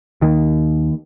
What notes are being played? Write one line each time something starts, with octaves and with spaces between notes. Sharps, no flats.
D#2 D#3 A#3